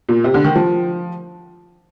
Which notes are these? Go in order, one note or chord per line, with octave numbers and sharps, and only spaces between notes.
A#2
C3
D3
D#3
F3